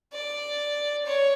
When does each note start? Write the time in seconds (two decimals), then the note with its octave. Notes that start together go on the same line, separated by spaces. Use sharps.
0.13 D5
1.05 C#5